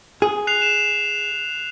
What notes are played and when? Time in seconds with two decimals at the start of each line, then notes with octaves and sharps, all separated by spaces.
0.22 G#4
0.47 F#6 C7 F7
0.62 E7